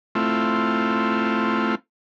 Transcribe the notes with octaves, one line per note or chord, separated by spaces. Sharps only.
A3 C4 E4 F4